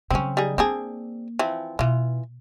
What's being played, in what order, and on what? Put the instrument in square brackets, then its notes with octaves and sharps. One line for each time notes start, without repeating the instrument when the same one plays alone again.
[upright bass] C#3 F#3 [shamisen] C4 C#4
[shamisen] G3 D#4 G#4
[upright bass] A#3 [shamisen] C4 D4 G#4
[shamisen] E3 F3 C4
[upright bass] B2 [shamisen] E3 F4